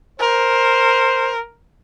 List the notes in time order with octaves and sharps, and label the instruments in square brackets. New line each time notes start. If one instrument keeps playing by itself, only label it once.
[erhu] A#4 [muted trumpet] C5